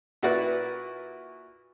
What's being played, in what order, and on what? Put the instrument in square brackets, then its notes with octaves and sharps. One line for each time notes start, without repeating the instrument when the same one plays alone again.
[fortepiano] A#2 E4 F#4 B4 D5 F#5